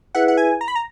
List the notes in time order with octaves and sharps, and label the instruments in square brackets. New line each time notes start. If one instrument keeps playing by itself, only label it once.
[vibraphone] E4 G#4 B4 E5 [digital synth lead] F#5
[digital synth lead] F#5
G#5
A#5
B5
A#5